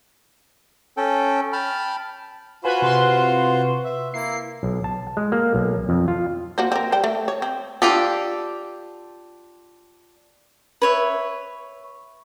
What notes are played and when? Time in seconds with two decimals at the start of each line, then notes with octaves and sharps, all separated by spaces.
0.97 C#4 A4 G5
1.53 G5 A5 B5 F6
2.64 F4 F#4 B4 C5 G#5 B5
2.82 C3 B4 C6
3.84 E5
4.14 A#3 E4 C7
4.63 B1
4.84 A5
5.17 G#3
5.32 A#3
5.54 B1
5.89 F2
6.08 F4
6.58 A#3 F#4 C5
6.72 C4 A#4
6.92 G3 C5 G5
7.04 A3
7.28 C#5
7.42 C4
7.82 D4 F4 G4 A4
10.82 B4 C#5 E5